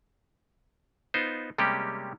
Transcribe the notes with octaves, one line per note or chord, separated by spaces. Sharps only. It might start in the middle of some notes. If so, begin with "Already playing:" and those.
B3 D#4 F4 C5
C3 G3 G#3 A#3 C#4 G4